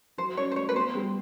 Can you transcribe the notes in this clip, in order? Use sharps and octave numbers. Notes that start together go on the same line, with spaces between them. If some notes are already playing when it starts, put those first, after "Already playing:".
F#3 C5
C#4 C#5
C5
A3 C#5
B4
B3 C5
G3